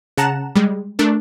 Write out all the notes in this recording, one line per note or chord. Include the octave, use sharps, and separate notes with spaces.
C#3 F#5 A5 A#5 F#6 E7
G3 G#3
A3 D4 A#4